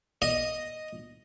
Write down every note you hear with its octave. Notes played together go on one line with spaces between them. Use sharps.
D#5